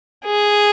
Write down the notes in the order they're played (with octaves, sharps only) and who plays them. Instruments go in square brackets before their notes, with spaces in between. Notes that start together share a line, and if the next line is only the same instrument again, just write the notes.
[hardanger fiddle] G#4